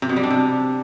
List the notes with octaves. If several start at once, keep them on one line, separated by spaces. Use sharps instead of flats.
C3
B2
G3
D4
C3